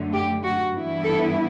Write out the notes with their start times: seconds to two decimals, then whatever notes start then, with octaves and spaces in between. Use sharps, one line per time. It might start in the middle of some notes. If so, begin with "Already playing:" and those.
Already playing: F#2 D3 A3
0.13 G4
0.43 F#4
0.72 G2 E3 B3 E4
1.03 A4